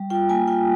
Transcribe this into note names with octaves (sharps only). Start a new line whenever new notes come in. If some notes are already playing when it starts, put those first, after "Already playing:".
Already playing: G3
F4 G5
A#3 G#5
F4 G5